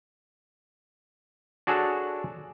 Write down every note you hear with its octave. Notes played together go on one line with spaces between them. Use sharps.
D4 F#4 G#4 A4 C#5